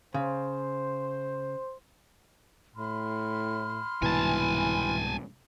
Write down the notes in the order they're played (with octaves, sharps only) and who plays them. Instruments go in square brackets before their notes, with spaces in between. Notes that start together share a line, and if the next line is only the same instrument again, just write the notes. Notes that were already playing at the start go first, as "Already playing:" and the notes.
[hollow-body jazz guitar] C#3 [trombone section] C5
[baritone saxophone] A2 [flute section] B5 C6 F6
[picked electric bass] C2 G#2 B2 [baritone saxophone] E3 [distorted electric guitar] G#5 A5